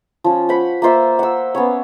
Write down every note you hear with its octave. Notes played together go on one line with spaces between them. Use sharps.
F3 C#4
C5 F#5 B5
A#3 F4 C5 E5
F#5 E6
B3 C#4 C#5